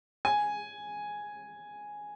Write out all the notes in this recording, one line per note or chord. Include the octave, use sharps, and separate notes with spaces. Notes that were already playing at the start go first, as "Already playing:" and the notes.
G#5